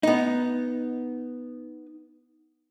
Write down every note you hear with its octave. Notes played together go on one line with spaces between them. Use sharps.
B3 D#4